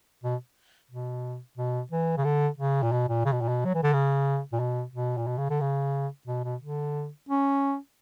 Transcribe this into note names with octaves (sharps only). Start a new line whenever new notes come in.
B2
B2
B2
E3
C#3
D3
C#3
A#2
B2
A#2
C#3
B2
A#2
B2
F#3
E3
D3
C#3
A#2
B2
B2
A#2
B2
C#3
D3
C#3
B2
B2
D3
C#4